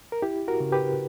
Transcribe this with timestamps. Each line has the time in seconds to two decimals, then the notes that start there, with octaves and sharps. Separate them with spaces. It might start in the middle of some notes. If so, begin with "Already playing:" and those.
0.12 A#4
0.22 E4 G4
0.48 F#4 A#4
0.60 C#3
0.72 G4 B4